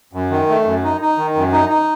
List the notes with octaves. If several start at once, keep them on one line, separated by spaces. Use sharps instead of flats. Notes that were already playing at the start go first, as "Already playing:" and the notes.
F#2
D#3
A3
F#2
D#4
D#4
D#3
F#2
D#4
D#4